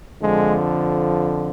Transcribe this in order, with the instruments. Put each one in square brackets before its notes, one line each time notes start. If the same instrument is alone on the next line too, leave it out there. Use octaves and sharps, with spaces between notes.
[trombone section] F2 D3 F3 G#3